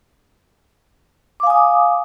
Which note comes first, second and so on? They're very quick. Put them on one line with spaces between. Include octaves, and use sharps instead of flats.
D6 F5 G#5 D#6